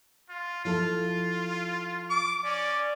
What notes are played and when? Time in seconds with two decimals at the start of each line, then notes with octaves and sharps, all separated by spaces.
0.29 F4
0.65 F3 E4 F4 A4
2.10 D6
2.45 C#4 D5